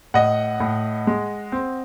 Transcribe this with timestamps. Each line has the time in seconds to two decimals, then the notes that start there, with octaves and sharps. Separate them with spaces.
0.14 A2 D#5 F#5
0.60 A2
1.07 G#3
1.52 C4